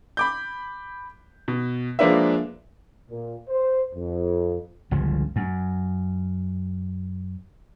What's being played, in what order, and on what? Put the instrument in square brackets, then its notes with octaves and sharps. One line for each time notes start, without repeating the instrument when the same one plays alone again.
[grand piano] B5 D6 G6
B2
F3 G#3 A#3 D4 B4 E5
[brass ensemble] A#2
C5
F2
[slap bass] G1 C#2 C#3 F3
F#2